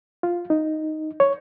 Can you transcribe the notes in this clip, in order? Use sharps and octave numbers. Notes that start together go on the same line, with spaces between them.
F4
D#4
C#5